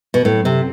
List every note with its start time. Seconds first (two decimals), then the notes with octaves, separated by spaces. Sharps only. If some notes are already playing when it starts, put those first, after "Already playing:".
0.14 B2
0.24 F#2 A2 F#3 C4
0.45 C3